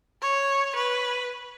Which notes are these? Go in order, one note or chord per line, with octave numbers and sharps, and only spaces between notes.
C#5
B4